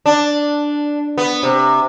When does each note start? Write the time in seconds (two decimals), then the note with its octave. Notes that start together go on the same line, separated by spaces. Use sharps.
0.06 D4
1.18 B3
1.43 C3